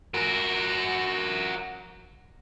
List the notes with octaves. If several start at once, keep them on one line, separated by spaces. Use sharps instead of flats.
F#4 A#4